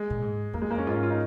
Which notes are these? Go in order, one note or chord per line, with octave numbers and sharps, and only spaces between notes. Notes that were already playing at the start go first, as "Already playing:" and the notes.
Already playing: G#3
A#2
G#2
F2 A#3
G#3
A#3
F2 C#4
G#2 F4
C#4
F4
D#4